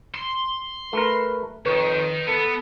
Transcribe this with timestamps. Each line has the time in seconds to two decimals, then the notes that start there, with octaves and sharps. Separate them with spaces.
0.14 C6
0.93 A3 A#4 B4
1.66 F2 D#3 B4 C#5
2.27 B3 A4